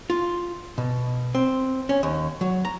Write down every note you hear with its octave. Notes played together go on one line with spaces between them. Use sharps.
F4
B2
C4
C#4
D#2
F#3
A#5